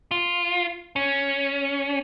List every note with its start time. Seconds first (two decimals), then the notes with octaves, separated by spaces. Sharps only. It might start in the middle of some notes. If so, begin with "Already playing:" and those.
0.11 F4
0.96 C#4